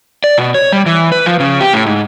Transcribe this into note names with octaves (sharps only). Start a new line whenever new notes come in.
D5
B2
C#5
G3
E3
B4
F3
C#3
G4
A2
G#2